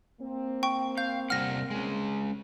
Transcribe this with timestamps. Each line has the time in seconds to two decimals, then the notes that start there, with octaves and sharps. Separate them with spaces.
0.21 A#3 C4
0.63 G5 C#6
0.98 F5 G6
1.30 C3 G3 F#5 F6 A#6
1.70 G#3 C#4